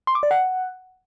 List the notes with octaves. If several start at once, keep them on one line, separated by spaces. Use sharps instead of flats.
C6
D6
D5
F#5